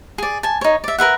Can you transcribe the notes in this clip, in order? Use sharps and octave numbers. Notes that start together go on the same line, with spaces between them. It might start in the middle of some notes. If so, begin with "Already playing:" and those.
G#4 D5
G#5 A5
D#4 C#5
D5 E5
A#4 B4 E5 F#5